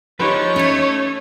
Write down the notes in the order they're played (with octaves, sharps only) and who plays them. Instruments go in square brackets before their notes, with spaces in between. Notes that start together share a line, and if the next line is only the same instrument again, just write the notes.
[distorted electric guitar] F3 [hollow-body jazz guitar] D#4 G4 B4 [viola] C#5
[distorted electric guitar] A3 [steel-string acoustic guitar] C#4 D#5